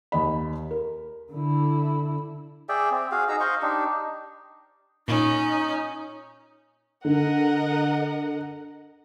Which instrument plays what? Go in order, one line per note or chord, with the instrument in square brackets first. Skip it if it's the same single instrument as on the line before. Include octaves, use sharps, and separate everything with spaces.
[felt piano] D#2 D#5 B5
A#4
[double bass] D3 E4
[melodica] G#4 D5 E5 G5
C4
F#4 G#4 F5
D#4 G#4 A#5 E6
C5 D#5 F5 C#6
D4 D#4 G4
[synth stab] A#2 [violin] C#4 [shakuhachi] D#4
[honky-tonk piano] D3 [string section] A#4 D#5 F#5